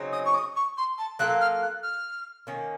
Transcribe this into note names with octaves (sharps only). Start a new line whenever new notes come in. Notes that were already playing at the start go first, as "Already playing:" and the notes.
Already playing: C#3 F#3 C4 D#4
D#6
C#6
D#6
C#6
C6
A5
F#3 A#3 F4 A4 F#6
F6
F#6
F6
D#3 A#3 C#4